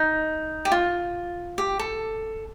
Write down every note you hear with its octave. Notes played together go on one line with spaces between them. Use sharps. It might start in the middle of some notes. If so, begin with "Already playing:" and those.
Already playing: D#4
G4
F4
G4
A4